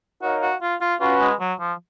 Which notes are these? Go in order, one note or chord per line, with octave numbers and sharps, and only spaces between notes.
D#4 F#4 A#4 C#5 F5
F#4
F4
F4
C#4 F4 F#4 B4
G#3
F#3
F3